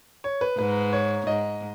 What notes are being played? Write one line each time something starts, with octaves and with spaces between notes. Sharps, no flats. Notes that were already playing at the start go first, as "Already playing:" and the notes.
C#5
B4
G#2 B4
C#5
G#2 D#5